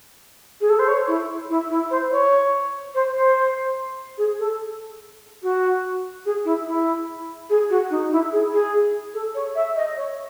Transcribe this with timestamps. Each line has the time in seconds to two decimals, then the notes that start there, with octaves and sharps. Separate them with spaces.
0.60 G#4
0.69 A4
0.79 C5
0.88 C#5
1.07 E4
1.50 E4
1.70 E4
1.90 C5
2.11 C#5
2.94 C5
3.14 C5
4.18 G#4
4.39 A4
5.43 F#4
6.25 G#4
6.45 E4
6.66 E4
7.49 G#4
7.70 F#4
7.90 D#4
8.11 E4
8.32 G#4
8.53 G#4
9.14 A4
9.34 C#5
9.55 E5
9.76 D#5
9.97 C#5